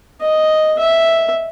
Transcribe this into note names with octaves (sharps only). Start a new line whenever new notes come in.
D#5
E5